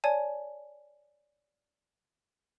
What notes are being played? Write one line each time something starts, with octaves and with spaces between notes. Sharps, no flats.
C#5 D5 G#5 A5